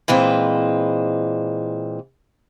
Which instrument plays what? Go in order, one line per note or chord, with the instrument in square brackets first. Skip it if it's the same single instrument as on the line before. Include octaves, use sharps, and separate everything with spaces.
[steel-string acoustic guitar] A#2 E3 G#3 C4